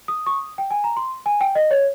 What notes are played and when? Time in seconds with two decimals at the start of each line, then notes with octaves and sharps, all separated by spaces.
0.08 D#6
0.26 C#6
0.30 D#6
0.58 G5
0.71 G#5
0.84 A#5
0.97 C6
1.26 G#5
1.41 G5
1.55 D#5
1.71 C#5